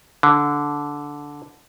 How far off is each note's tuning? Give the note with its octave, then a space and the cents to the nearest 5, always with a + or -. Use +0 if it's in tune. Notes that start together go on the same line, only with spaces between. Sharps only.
D3 -10